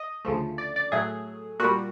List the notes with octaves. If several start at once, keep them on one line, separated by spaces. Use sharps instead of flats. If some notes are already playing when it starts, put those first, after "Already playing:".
Already playing: D#5
D2 C#3 F3 A3
D5
D5
A2 F#3 A3 G#4
A#2 G3 F#4